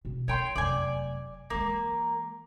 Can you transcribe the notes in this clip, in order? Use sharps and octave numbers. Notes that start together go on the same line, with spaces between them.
B2
E4 C#5 G5 C6
F1 F#2 D5 G#5
E3 G#3 A#3